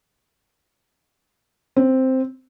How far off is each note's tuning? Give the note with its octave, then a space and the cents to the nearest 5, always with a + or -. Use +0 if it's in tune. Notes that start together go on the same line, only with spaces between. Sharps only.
C4 +0